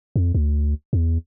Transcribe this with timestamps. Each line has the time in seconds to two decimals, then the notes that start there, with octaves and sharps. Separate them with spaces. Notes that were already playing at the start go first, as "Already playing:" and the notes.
0.16 F2
0.35 D2
0.93 E2